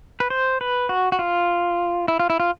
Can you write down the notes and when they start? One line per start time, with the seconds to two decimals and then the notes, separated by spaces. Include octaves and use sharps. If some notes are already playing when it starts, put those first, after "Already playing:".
0.20 B4
0.30 C5
0.61 B4
0.89 F#4
1.12 F#4
1.19 F4
2.08 E4
2.19 F4
2.30 E4
2.40 F4